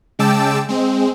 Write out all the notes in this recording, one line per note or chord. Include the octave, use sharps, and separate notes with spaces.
C#3 G#3 G5 A5 D6 E6
G#3 C4